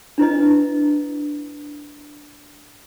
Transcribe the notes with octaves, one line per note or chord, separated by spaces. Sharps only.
D4 E4 B4 D#5